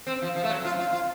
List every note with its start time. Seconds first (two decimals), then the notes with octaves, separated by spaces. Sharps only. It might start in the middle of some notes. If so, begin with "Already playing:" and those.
0.07 C4
0.22 F3
0.36 F3
0.44 A3
0.50 F#3
0.65 F4
0.79 F4
0.93 F4